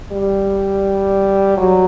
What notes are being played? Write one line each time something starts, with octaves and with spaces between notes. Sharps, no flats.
G3
F#3